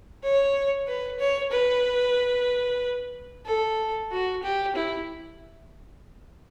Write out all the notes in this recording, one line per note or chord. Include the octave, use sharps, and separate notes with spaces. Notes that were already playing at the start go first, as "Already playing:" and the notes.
C#5
B4
C#5
B4
A4
F#4
G4
E4